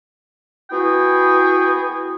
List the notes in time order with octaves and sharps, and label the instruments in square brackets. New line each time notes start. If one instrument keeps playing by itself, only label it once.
[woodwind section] B3 E4 F#4 G#4 G5